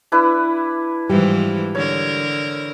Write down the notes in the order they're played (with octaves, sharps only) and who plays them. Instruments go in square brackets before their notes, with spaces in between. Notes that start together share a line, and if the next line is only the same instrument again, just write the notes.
[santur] D4 E4 B4
[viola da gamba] G#2 E3 F3 [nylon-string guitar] G3
[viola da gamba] D3 A#4 [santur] C#5